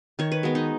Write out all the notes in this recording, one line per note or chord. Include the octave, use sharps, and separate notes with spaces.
D#3 C#5
B4
G#3 B3 F#4
D#4